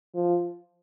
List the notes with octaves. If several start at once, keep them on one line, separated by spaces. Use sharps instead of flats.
F3